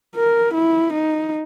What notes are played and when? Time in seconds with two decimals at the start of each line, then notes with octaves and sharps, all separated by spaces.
0.16 A#4
0.54 E4
0.93 D#4